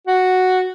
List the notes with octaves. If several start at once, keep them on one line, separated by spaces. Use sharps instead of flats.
F#4